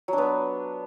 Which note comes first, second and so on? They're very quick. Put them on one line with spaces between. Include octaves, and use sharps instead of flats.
F#3 D4 B3